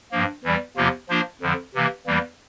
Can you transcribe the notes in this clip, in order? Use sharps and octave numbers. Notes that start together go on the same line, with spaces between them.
G2 F3 A#3
E2 E3 G3
E2 C3 F3 A#3 F4
F3 A#3 D4 F4 C5
F2 D3 F3
C3 E3 A#3
E2 E3 G3 A#3